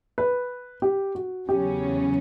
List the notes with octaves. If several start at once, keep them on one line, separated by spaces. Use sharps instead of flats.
B4
G4
F#4
E2 C#3 F#3 C#4 G4